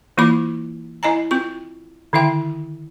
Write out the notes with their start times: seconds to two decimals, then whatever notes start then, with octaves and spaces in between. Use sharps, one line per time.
0.17 E3 A#3 E4 F4 B5 D6
1.03 E4 D#5 G#5 A#5
1.31 C4 F4 C#6
2.13 D3 D#3 E4 E5 G5